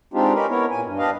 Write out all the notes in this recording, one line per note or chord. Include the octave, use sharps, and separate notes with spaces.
G#3 C4 D4 D#4 F4 G4
C#4 D#4 G4 A#4 B4
B3 E4 A#4 C#5
A#2 G#5
G2
D4 G4 B4 D#5 F5